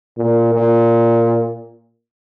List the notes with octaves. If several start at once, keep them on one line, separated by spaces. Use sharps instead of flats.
A#2
A#2